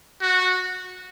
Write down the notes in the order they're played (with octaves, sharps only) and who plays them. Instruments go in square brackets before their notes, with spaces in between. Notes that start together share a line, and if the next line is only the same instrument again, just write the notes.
[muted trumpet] F#4